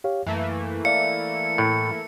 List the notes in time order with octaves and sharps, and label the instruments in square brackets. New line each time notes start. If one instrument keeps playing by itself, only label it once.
[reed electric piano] G4 C#5 F5
[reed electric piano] F#2 [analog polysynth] E3 A3 A#3
[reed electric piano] D5 E5 F5 [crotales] C#7
[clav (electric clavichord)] A2